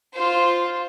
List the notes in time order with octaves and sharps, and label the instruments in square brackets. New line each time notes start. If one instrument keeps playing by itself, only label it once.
[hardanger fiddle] F4 C5